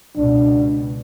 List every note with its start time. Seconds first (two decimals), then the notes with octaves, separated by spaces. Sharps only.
0.16 C#2 B2 D4